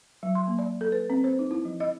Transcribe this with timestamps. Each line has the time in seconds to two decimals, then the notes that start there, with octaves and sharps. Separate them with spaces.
0.23 F#3
0.35 C6
0.47 A#3
0.59 D5
0.81 A4
0.92 B4
1.10 C4
1.24 C5
1.39 D#4
1.51 E4
1.65 F3
1.80 D#5